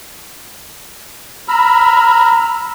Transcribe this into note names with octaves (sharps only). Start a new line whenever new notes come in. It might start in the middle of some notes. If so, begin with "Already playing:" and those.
A#5 B5 E6 F6